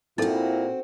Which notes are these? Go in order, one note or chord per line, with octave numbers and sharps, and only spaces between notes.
A#2 C4 D#4 E4 F#4 A4